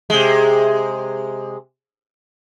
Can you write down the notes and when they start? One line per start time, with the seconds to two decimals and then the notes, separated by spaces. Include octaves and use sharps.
0.10 C3 G#3